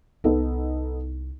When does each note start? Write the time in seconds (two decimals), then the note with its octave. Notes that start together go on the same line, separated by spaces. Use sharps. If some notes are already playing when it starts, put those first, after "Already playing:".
0.24 C2 B3 D#4 A4